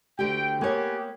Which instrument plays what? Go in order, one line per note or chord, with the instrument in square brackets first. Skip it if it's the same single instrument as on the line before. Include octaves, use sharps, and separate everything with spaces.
[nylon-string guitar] D2 D3 G4 [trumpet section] G5
[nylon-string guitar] A#3 C#5 [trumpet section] B3 G4 G#5